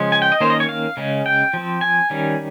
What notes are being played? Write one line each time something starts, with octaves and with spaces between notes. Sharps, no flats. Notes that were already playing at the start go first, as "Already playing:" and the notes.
Already playing: C#3 F3 G#3 C#4
G#5
G5
D#5
D#3 A#3 C#4 C5
D#5
C#5
F5
C#3 G#3 C#4
G5
F3 C4
G#5
D#3 G3 C#4